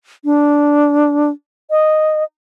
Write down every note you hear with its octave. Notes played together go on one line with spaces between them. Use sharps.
D4
D#5